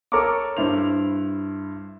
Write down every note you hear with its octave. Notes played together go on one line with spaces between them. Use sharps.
A4 A#4 C#5 A#5 C#6 D6
G2 E4 C5 F7